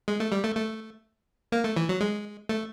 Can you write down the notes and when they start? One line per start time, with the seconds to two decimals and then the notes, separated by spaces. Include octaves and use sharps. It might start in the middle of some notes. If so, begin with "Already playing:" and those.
0.08 G#3
0.20 A3
0.32 G3
0.44 A3
0.55 A3
1.52 A#3
1.64 A3
1.76 E3
1.89 F#3
2.01 G#3
2.49 A3